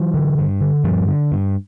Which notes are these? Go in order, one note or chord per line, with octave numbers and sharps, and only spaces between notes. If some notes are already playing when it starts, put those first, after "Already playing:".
Already playing: E3 F#3
D3
G2
D3
G2 F3 G3
D3
G2